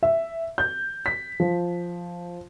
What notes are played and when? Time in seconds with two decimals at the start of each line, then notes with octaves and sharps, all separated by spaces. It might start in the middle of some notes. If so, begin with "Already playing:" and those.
0.03 E5
0.58 G6
1.06 B6
1.40 F3